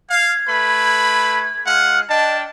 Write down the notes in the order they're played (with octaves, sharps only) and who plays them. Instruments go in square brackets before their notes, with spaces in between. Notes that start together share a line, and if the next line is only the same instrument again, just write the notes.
[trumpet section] F5 [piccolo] G#6
[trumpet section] A3 B4 B5
[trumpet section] G#3 F4 F#5 [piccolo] F6
[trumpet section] D4 G5 A5 [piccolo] D#5